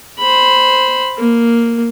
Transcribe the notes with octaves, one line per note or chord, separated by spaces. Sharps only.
C5 B5
A#3